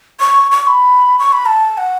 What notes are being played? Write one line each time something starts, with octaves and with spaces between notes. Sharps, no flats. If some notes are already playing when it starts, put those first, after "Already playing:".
C#6
C#6
B5
C#6
B5
A5
F#5